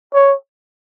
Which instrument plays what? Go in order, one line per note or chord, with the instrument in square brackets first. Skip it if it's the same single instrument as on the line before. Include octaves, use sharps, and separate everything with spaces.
[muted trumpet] C#5